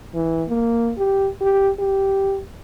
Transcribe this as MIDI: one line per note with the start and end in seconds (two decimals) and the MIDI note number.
0.15 0.43 52
0.49 0.92 58
0.98 1.29 67
1.41 1.69 67
1.79 2.40 67